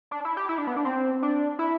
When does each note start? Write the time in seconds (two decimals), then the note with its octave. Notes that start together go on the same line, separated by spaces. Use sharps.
0.11 D4
0.25 E4
0.37 G4
0.49 E4
0.58 D4
0.67 B3
0.76 D4
0.85 C4
1.22 D4
1.59 E4